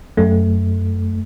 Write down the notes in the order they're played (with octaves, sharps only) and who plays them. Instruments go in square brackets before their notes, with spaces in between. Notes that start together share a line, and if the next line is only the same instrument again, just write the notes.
[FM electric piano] F#2 A3